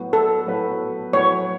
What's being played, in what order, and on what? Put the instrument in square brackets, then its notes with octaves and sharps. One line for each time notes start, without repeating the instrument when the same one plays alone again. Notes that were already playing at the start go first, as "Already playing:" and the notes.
Already playing: [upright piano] A2 F#3 B3 F#4 B4
[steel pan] A4
[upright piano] A2 F#3 B3 F#4 B4
[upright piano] A2 F#3 B3 F#4 B4 [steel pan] C#5